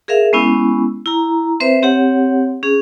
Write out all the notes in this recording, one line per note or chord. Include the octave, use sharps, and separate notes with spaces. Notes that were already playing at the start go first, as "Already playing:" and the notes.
G#4 A#4 E5 F5
G#3 B3 C#4 E4
E4 A#5
C4 B4 C5 E5
C4 G4 C#5 F#5
C#4 G#4